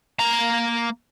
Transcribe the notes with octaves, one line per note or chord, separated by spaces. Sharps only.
A#3 A#5